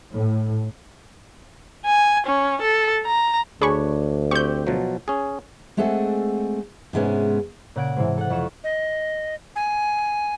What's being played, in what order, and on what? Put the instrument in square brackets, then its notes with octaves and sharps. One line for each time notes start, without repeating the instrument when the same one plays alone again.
[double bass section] A2
[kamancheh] G#5
C#4
A4
A#5
[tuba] D2 [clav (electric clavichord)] D4 C#5 [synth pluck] G#4 B5 C#6
[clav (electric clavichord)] C4 G4 [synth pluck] C#6 G6
[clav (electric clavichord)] B2 F3 F#3
C#4 G#4
[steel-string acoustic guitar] G#3 A3 C4 G#4 A4 F#5
G#2 C3 G#3 B3 C#4
[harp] A#2 C#3 F#5 G#6 D7
G#2 C3 E3
A4 F#5
F2 C#6 E7
[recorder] D#5
G#5